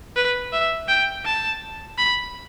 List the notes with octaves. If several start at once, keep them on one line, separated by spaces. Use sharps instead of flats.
B4
E5
G5
A5
B5